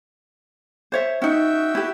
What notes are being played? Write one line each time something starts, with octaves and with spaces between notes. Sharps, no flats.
C5 C#5 E5
C#4 D#4 F#4 E5 G5
E4 G4